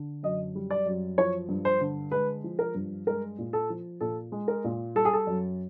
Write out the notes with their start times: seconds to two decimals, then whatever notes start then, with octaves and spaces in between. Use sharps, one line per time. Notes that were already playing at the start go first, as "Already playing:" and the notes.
Already playing: D3
0.23 F#2 D#5
0.55 G3
0.70 D5
0.86 F#2
1.18 F3 C#5
1.49 G2
1.65 C5
1.81 D3
2.12 G#3 B4
2.44 F3
2.59 A#4
2.75 G2
3.07 G#3 A#4
3.39 A#2
3.53 A4
3.70 F3
4.01 A#2 A4
4.32 G#3
4.48 A#4
4.64 A#2
4.95 G3 A4
5.05 G#4
5.13 A4
5.27 F#2